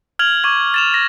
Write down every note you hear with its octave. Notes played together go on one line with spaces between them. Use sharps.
F6 G#6 F7 F#7
C#6 D6 G#6
A6 E7 F7
A#6